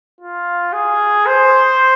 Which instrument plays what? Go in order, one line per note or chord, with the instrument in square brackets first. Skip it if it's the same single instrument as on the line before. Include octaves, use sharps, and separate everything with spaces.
[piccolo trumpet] F4
G#4
C5